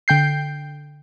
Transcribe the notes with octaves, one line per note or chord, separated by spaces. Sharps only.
D3 G5 G6 C7